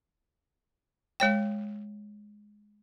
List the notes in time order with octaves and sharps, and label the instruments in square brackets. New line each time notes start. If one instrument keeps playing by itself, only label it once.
[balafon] G#3 C#5 G5